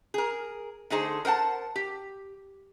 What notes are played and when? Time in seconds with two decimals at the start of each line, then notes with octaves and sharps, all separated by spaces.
0.14 G#4 A#4
0.90 D3 A3 D#4 G#4 C5
1.25 A#4 C5 F#5 A5
1.76 G4